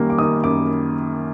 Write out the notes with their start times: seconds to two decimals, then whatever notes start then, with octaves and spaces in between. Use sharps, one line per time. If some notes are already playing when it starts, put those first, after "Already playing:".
Already playing: F#2 D#3 G3 A#3
0.10 D6
0.18 D#3 D#6
0.43 F#2 D6